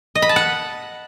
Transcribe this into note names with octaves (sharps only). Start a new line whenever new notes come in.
D#5
B5
A5
F#5